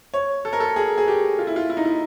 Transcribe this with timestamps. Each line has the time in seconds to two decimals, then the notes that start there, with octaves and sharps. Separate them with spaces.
0.14 C#5
0.45 A4
0.53 A#4
0.60 A4
0.76 G#4
0.98 G#4
1.08 G4
1.39 F4
1.47 E4
1.56 F4
1.70 E4
1.77 D#4
1.85 E4